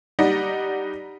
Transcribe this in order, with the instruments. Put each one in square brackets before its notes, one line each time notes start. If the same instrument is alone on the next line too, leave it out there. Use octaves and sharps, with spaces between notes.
[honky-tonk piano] G3 D#4 D5 D#5 F#5